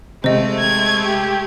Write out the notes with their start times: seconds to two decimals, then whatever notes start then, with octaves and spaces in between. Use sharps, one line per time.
0.24 C3 G#3 A3 C5 D#5
0.59 G#6
1.05 G4